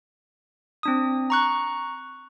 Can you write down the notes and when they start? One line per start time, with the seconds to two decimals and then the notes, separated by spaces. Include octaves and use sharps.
0.83 C4 D4 D#6
1.30 A#5 C#6 F#6